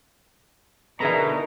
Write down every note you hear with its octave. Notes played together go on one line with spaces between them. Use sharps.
B2 D3 D#4 E4 G#4 A#4 A#5